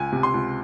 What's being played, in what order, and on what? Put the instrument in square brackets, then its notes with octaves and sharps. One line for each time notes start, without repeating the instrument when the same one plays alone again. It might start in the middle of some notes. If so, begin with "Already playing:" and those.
Already playing: [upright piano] C#2 G#5
C3
C6
C#2